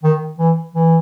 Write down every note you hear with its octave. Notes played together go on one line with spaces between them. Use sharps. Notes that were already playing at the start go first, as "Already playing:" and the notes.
D#3
E3
E3